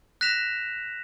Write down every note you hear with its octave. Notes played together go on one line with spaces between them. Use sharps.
F#6 A#6 B6 E7 F7